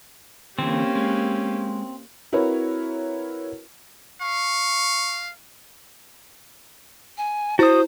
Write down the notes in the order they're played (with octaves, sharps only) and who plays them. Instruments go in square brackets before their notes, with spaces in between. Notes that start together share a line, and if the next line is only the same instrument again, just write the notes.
[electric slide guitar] D3 E3 [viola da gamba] A#3 C#4 G4 [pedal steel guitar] C4
[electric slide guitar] G#3
[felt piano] C4 E4 F#4 A#4 B4 C#5
[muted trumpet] F5 [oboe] C#6
[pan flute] G#5
[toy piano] E4 [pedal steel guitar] F#4 D#6 [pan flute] C5